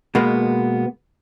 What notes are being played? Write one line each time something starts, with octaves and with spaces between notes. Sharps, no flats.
B2 G#3 A#3 B3